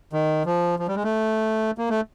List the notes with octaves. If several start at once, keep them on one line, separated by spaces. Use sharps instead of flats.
D#3
F3
F3
G3
G#3
A3
A#3
A3